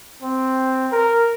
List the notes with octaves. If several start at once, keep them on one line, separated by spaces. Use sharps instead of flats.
C4
A#4